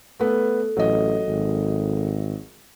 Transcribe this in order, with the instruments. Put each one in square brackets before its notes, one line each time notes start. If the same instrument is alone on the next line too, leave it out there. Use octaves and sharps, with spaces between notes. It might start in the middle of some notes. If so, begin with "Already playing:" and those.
[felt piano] A3 B3 B4 [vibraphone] A4
[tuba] A1 [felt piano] F#3 D#5
[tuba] G#1